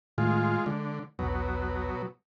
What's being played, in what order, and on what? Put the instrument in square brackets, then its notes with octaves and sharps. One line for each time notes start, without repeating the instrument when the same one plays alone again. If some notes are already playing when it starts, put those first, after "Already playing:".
[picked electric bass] A2 D#3 A3 [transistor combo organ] G#3 F4
[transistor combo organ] D3 [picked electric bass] G#3
[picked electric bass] E1 B1 [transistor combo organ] B2 F#3